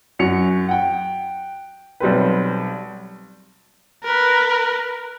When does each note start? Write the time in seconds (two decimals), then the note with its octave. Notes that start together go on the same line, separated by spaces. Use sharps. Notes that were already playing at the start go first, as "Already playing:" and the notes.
0.19 F#2 F#4 C#7 F7
0.68 F#5 G5
2.00 B1 G3 C4 B4
4.03 A#4 B4